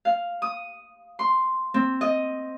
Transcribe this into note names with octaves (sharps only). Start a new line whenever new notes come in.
F5
D#6
C6
C4
D#5